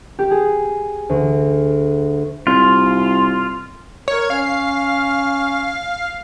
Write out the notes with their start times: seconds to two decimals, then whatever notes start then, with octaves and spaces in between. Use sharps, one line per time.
0.19 G4
0.31 G#4
1.09 D2
2.47 C2 F4
4.08 A#4 C#5
4.30 C#4 F5